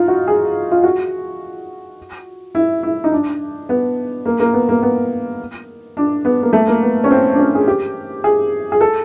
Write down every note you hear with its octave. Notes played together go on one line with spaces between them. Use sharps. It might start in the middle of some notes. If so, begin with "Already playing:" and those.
Already playing: D#4 F4
F#4
G#4
F4
F#4
E4
E4
D#4
D4
B3
A#3
A#3
B3
A#3
B3
D4
B3
A#3
A3
A#3
B3
C#4
C4
D4
C#4
G#4
G4
G#4
G#4
A4